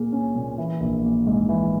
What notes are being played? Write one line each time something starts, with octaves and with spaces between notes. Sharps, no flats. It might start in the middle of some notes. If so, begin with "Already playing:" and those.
Already playing: A#2 A#3 G#4
C#4
A#2
E3
A#1
A#3
G#2
E3